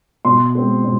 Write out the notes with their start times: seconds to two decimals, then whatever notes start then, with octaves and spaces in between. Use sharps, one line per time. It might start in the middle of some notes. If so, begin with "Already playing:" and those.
0.25 B2 C6
0.55 G#3 C4
0.84 B2